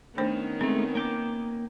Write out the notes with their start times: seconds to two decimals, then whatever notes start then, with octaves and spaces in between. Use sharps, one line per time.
0.18 D#3 A3 B3 C#4 D4 C5
0.61 G#3 A3 C4
0.95 A#3 G5 D6